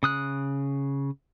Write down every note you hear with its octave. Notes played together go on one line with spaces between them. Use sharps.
C#3 D#6 F#6